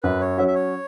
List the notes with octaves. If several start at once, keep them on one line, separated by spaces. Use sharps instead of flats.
F#2 B4
C#5
F#3 C#4 F#4 E5
E5
C#5